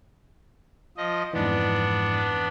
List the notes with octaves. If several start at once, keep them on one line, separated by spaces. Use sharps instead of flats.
F3 D#5
F2 G#2 E3 B3 D4